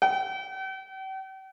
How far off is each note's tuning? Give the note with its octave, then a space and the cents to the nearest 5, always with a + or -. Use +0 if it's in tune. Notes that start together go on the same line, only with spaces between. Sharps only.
G5 -45